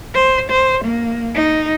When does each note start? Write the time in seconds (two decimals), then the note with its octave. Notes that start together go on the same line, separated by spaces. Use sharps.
0.15 C5
0.51 C5
0.85 A#3
1.35 D#4